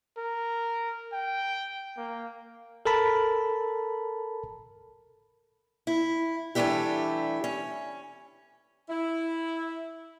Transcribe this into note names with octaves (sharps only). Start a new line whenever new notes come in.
A#4
G5
A#3
A4 A#4 A5 B5
E4
E3 G3 A3 D4 E4 G4
C#4
E4